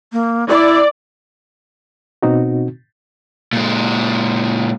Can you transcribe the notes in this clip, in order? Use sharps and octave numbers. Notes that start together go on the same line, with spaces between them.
A#3
E4 D5
B2 C4 D#4 F#4
A#2 G#3